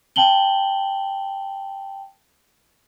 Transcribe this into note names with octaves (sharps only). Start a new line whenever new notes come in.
G5 A5 F#7 G7